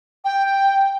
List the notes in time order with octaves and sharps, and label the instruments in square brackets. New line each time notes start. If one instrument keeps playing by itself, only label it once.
[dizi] G5